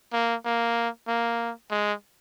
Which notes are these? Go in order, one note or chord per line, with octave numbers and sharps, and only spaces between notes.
A#3
A#3
A#3
G#3